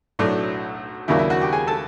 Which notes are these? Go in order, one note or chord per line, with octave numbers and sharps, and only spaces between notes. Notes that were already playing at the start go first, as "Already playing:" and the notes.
B1 A2 F#3 A3 D4
D#2 C#3 F#3 A#3 D4 E4 E5
E4 E5
F#4 F#5
G4 G5
G#4 G#5
A4 A5